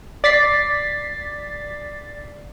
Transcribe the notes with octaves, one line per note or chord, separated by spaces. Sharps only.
D5 A6 B6 C7